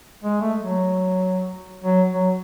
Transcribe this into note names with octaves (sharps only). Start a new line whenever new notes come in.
G#3
A3
F#3
F#3
F#3